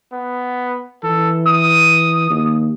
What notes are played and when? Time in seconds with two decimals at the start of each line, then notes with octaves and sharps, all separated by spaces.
0.12 B3
1.04 E3 A4
1.48 D#6
2.30 D#2